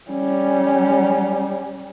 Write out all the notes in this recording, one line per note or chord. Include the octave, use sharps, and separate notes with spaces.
G3 C#4